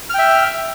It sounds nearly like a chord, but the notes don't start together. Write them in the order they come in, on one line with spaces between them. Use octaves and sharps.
F6 G5 E5